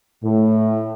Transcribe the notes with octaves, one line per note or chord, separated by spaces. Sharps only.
A2